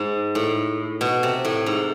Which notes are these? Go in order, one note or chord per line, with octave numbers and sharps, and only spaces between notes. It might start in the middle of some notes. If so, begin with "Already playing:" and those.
Already playing: G#2
A2
B2
C3
A2
G#2